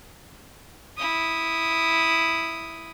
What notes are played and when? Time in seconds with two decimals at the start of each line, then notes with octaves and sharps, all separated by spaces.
0.97 E4 D#6